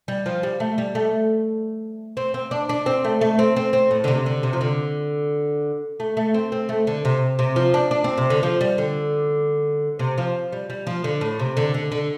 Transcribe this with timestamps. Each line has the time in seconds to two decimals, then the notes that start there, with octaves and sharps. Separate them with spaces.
0.08 G3
0.26 F3
0.43 G3
0.60 A3
0.78 G3
0.95 A3
2.17 C4
2.34 C4
2.51 D4
2.69 D4
2.86 C4
3.04 A3
3.21 A3
3.39 C4
3.56 C4
3.73 C4
3.91 A2
4.04 D3
4.08 C3
4.26 D3
4.43 C3
4.53 F3
4.61 D3
6.00 A3
6.17 A3
6.34 C4
6.52 C4
6.69 A3
6.87 D3
7.05 C3
7.39 C3
7.56 F3
7.74 D4
7.91 D4
8.04 C4
8.18 C3
8.30 D3
8.43 F3
8.61 G3
8.78 D3
9.99 C3
10.18 F3
10.52 G3
10.70 G3
10.87 F3
11.04 D3
11.21 A2
11.40 C3
11.57 D3
11.74 D3
11.92 D3